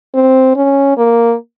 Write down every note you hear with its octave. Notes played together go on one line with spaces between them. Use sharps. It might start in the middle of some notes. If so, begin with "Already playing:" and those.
C4
C#4
A#3